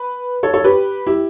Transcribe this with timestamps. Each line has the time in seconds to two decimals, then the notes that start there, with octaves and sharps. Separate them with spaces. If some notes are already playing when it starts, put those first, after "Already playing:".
Already playing: B4
0.43 A4 C#5
0.54 A4 C#5
0.64 G4 B4
1.07 E4 G4